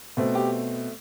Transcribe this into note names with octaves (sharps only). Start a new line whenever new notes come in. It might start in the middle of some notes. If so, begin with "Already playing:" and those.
B2 A3 C4
G4